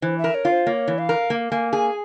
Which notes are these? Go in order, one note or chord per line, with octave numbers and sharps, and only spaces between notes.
E3 C5
E5
A#4
C#5
F4
C5
A#3 C#5
E3
F5
A#4
A#3
A#3 G#5
G#4 G#5